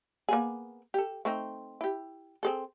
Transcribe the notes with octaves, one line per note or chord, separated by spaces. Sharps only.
A#3 B3 G#4
G4 A4
A3 C4 D#4
E4 G4
C4 G#4 A4